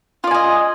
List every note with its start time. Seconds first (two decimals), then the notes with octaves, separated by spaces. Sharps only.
0.24 F4
0.27 D5
0.31 G#5
0.34 D#5